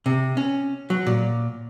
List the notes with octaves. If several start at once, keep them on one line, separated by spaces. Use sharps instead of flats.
C3
C#4
F#3
A#2